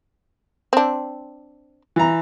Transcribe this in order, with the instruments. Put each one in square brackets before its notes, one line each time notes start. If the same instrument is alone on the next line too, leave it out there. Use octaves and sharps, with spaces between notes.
[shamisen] C4 D4
[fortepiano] E3 A#5